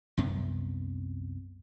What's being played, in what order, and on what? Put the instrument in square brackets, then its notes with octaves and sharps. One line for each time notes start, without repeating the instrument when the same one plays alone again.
[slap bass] C2 F#2 C3 B3